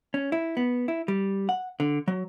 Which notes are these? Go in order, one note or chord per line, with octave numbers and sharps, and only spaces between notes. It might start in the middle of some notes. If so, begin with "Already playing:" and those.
C#4
E4
B3
E4
G3
F#5
D3
F#3